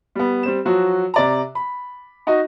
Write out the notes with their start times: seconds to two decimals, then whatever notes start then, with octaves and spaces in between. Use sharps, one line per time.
0.15 G3 B3
0.43 G3 C4 E7
0.65 F3 F#3 F#4
1.14 C3 D5 A#5
1.55 B5
2.27 D#4 F#4 D#5